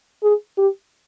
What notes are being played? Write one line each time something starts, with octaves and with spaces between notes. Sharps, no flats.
G#4
G4